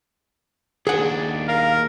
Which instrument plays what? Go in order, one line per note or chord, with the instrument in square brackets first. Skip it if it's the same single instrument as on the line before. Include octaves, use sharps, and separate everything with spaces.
[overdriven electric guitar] D#2 D4 [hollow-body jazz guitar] G#4 F#5
[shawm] A#4 [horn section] F5